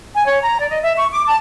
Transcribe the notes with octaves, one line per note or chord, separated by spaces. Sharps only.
G#5
C#5
A#5
D5
D#5
E5
C#6
D6
A5